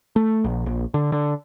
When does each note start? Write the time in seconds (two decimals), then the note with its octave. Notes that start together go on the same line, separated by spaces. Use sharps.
0.16 A3
0.44 A#1
0.66 A#1
0.94 D3
1.12 D3